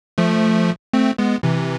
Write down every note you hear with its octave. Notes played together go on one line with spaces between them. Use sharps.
F3 A3
A3 C4
G#3 B3
C3 E3